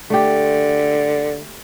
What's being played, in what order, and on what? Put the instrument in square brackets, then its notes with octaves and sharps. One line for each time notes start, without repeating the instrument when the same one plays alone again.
[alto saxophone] D3 [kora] A3 G4